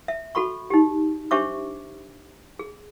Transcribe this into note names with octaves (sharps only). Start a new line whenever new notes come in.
E5
F#4 A4 B5 C#6
D#4 G4
D4 G4 C5 E5 C#6 D6
G#4